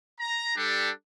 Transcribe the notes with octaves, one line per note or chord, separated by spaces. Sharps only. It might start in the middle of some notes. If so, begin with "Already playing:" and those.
A#5
G3 D4 G4 A4